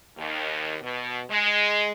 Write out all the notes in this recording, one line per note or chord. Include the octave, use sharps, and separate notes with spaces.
D#2
B2
G#3